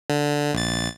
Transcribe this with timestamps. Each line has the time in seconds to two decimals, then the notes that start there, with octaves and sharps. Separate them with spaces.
0.10 D3
0.54 A#1 A6